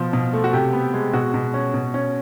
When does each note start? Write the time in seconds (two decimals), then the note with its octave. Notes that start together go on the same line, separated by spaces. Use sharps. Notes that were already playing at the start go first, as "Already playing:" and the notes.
Already playing: B2 F3 C5
0.13 B2
0.33 A3
0.44 F#4
0.53 C3 G4
0.73 B3
0.94 G#3
1.13 B2 F#4
1.34 B2
1.54 C#4
1.74 B2
1.94 C#4